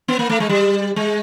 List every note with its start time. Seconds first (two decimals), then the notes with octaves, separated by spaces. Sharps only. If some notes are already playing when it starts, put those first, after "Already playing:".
0.08 B3
0.19 A#3
0.30 A3
0.40 G#3
0.49 G3
0.96 G#3